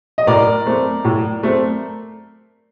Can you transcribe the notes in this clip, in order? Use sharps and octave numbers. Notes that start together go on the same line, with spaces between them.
D#5
A2 A#4 D5
A3 C4
A2
A3 C4